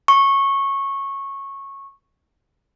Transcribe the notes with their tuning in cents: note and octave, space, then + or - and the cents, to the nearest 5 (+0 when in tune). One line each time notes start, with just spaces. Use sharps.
C#6 -15